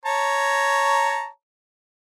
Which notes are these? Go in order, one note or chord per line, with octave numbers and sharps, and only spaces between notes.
C#5 A5 A#5